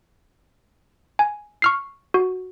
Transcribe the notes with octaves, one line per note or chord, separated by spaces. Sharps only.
G#5
C#6 F6 C7
F#4